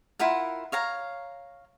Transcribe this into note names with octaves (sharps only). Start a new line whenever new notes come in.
E4 F4 A#4 F#5
C#5 F5 A#5